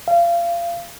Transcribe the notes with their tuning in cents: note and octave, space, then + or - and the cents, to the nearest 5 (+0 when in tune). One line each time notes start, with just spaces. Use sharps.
F5 -30